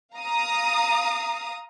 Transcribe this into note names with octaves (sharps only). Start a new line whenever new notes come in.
F5 A#5 D#6